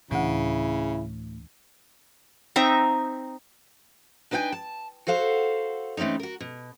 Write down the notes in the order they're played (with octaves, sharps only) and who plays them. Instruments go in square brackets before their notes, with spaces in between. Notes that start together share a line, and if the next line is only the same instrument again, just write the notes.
[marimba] D2 E3 [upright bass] A2 [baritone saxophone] C#3 [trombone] E4
[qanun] C4 D#4 E5 A#5
[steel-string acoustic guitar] D4 D#4 B4 F5 G5 G#5
A5
F#4 A4 C5 F5 F#5
E3 A3 C4 C#4 D#4
F#4 A#4
B2